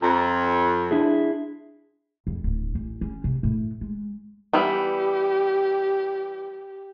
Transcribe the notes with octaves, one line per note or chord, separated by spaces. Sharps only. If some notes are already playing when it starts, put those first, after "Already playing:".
F2 A#5
D4 E4 G#4
F2
D1
A1
C#4
C3
A2
G#3
E3 G3 B3 G4